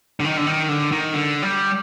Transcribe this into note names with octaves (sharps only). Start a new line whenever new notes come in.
D3
D#3
D3
D#3
D3
D#3
D3
G3